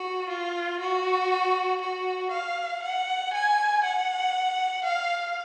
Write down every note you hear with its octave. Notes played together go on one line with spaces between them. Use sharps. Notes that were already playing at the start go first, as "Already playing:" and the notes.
Already playing: F#4
F4
F#4
F#4
F5
F#5
G#5
F#5
F5